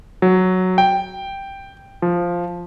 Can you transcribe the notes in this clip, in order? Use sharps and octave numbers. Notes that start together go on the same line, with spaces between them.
F#3
G5
F3